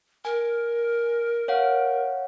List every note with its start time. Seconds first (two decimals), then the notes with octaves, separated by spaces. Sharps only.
0.25 A#4 G#5
1.48 C#5 F5 F#5